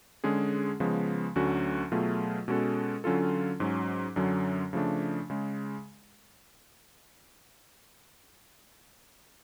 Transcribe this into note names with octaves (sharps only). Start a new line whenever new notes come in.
D3 G#3 C#4 G#4
C#3 F3 G#3 B3
D2 D3 F#3 C#4 F#4
B2 F#3 A3 F4 G#4
B2 G#3 C#4 F#4 A4
D3 F#3 C#4 F4 A4
G#2 F#3 C#4
F#2 D3 F#3 C#4
C#3 F3 A3 D4
C#3 G#3